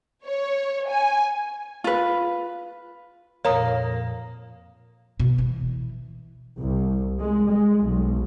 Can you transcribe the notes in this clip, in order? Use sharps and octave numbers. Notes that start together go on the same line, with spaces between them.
C#5
G#5
F4 B4
F2 A#2 A#3 C#5 A#5 D#6
B2
E3
C2
G#3
G#3
B1